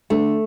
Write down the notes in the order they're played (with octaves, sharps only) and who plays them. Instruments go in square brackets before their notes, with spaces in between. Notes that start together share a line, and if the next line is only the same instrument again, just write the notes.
[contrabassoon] D3 [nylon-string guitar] A3